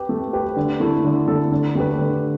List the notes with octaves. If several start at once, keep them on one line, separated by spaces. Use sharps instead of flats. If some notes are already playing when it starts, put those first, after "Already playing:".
Already playing: G4 B4
A3
G4 B4
D3
A3 E4 A4
D3
A3 E4 A4
D3
A3 G4 B4
D3